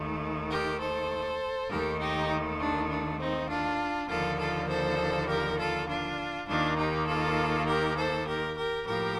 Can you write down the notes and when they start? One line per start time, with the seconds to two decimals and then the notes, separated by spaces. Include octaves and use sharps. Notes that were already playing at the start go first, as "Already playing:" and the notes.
Already playing: D#2 D#3 A3
0.50 G4 A#4
0.80 A4 C5
1.69 D#2 D#3 A3 G4 A#4
1.99 D#4 G4
2.60 D4
2.90 D4
3.19 C4 D#4
3.49 D4 F4
4.08 D#2 D3 F3 A#3 F4 A4
4.39 F4 A4
4.68 A4 C5
5.28 G4 A#4
5.58 F4 A4
5.88 D4 F4
6.48 D#2 D#3 A#3 D4 F4
6.78 D#4 G4
7.07 F4 A4
7.67 G4 A#4
7.97 A4 C5
8.27 G4 A#4
8.57 G4 A#4
8.86 A2 F3 A#3 G4 A#4